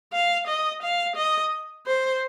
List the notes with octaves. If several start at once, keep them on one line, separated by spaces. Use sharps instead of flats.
F5
D#5
F5
D#5
C5